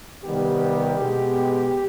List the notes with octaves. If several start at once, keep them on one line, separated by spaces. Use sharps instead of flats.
C3 D#3 G3 B3 G4
B2 G#3 B3